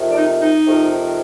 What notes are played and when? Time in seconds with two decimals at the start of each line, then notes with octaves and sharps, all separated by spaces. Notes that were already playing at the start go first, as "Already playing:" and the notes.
Already playing: F2 C3 D#3
0.11 D4
0.16 D#4
0.41 D#4
0.67 F2 C3 D#3